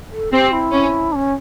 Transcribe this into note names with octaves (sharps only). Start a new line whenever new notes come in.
A4
C4 G4 G#4
E4
C#4
D4
C#4